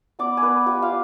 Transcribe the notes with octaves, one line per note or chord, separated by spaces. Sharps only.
B3 D5 D6
G#5
B3 B4 B5
F4 G4 G5
F4 F5